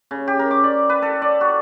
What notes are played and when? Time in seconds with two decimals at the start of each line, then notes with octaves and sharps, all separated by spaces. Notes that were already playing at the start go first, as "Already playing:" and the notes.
0.11 C#3
0.28 G4
0.39 A#4
0.51 D6
0.64 D5
0.89 B4
1.02 A4
1.22 D5
1.41 F#4